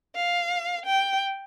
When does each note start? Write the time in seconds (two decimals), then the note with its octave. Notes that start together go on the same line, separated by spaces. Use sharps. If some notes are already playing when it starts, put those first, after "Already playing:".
0.16 F5
0.86 G5